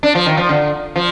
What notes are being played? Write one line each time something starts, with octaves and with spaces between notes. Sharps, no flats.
D4
F3
D#3
F3
D3
F3